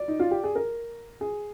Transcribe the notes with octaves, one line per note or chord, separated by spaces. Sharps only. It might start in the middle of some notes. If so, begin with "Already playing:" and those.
Already playing: D5
D#4
F4
G4
G#4
A#4
G#4